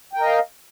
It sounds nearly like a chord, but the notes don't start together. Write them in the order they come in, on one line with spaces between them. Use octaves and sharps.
G5 A#4 D#5 F5